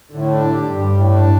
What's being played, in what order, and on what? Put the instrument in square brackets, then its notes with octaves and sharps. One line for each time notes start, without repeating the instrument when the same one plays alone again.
[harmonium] A2 [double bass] D3
[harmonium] D4
G4
[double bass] G2 [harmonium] G3
[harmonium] A2
D4